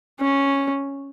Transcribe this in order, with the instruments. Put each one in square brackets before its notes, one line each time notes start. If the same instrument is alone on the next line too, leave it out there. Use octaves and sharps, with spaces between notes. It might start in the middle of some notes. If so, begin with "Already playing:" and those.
[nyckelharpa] C#4